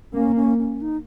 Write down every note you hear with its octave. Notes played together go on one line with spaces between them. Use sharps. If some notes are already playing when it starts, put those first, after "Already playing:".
A#3 C#4
C#4
C#4
D#4